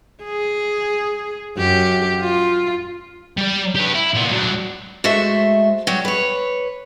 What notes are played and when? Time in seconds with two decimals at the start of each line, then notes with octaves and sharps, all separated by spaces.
0.24 G#4
1.57 F#2 G4
2.20 F4
3.37 G3 D5
3.76 G4 B4
3.95 E4
4.15 A#2 B3
4.32 F#3 D4
5.04 G#3 A3 F#4 C5 E5
5.87 F#3 G3 G4
6.05 B4 C#5